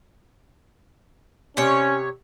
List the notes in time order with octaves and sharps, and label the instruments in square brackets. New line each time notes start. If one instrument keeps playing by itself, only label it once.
[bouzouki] C3 C#5 [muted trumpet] C#4